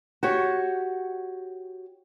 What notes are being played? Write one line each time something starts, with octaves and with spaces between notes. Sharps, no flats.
F#4 G4 C#5